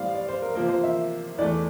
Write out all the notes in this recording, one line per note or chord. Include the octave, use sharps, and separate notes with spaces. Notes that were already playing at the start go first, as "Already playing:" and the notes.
Already playing: A2 G3 C4 D5 F5
D5
C5
A#4
C3 F3 A#3 A#4
C5
E5
E2 E3 A3 D5